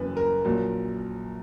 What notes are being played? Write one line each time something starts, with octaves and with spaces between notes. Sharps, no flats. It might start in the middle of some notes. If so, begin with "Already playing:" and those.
Already playing: F#1 F#2 E3 B4
A#4
A#1 A#2 F#3